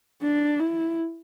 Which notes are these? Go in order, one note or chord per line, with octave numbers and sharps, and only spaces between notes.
D4
E4